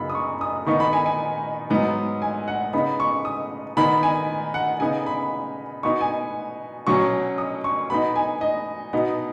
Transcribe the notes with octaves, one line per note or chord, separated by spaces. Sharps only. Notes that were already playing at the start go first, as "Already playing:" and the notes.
Already playing: F#2 C#3 B3 D#4 B5
D#6
C#6
D#6
D#3 B3 D#4 C#6
B5
G#5
G#5
G#2 F#3 B3 D#4
G#5
F#5
C#3 B3 D#4 B5
C#6
D#6
D#3 B3 D#4 B5
G#5
F#5
C#3 B3 D#4 G#5
B5
B2 B3 D#4 C#6
G#5
B2 F#3 C#4 C#6
D#6
C#6
B2 B3 D#4 B5
G#5
D#5
B2 B3 D#4